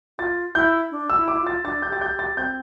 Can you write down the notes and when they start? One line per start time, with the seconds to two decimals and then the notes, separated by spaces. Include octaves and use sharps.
0.19 F4 A6
0.55 E4 G6
0.91 D4
1.10 E6
1.17 E4
1.28 D6
1.33 E4
1.41 F4
1.47 A6
1.64 D4 A6
1.82 G6
1.89 G4 A6
2.01 G6
2.14 G4
2.19 A6
2.37 C4 G6